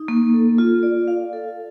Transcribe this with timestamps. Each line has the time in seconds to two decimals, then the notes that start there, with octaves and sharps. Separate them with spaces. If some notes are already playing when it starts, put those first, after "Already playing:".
Already playing: D#4
0.08 A#3
0.34 A4
0.58 F4
0.83 D5
1.08 F5
1.33 A4